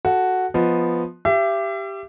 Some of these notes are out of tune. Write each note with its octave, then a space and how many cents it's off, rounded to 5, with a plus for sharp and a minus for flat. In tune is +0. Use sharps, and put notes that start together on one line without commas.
F#4 +0 A4 +0
F3 +0 B3 +0 D#5 +0
G4 +0 E5 +35